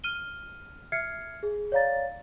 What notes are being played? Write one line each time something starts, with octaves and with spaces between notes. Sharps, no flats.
F6 D#7 G7
E5 F6 G#6 C7 C#7
G#4
C#5 D5 F5 A#5 A6